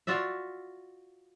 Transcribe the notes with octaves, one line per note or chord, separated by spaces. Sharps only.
F4 F#4 D5 E5